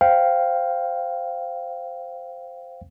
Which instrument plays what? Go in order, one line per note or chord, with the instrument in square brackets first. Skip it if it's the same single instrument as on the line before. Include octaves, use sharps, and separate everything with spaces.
[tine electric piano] C5 F5 G5